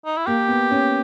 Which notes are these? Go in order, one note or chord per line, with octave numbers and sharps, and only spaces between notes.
D#4
E4
A#3 G4
B3
C#4